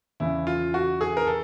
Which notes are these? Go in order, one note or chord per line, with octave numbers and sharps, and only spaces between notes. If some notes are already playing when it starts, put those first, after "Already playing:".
E2 C#3 E3 E4
F4
F#4
G#4
A#4
A4